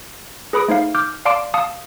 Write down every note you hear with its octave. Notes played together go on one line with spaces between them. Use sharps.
G#4 B4 B5 D#6 D7
A3 D#4 C5 F5
D6 F6 G6
D5 F5 A5 C6 D6 D7
F5 A5 D#6 C#7